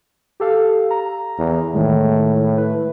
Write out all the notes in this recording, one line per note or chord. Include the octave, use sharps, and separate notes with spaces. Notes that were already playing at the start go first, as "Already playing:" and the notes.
G4 A4 F5
A#5
E2
A2 D#3 G#3
B4